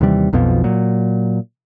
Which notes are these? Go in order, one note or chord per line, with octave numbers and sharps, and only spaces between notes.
D#2 C3 E3 G3
B1 F2 B2 F3
A#2 F#3